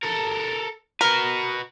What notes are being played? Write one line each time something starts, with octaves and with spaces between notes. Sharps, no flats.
A4 A#4
F#4 A#4 B4